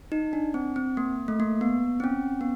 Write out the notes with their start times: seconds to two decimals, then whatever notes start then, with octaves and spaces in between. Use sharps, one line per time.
0.12 D#4
0.33 D4
0.54 C4
0.76 C4
0.97 A#3
1.28 A3
1.40 A#3
1.61 B3
2.00 C4
2.04 C#4
2.41 B3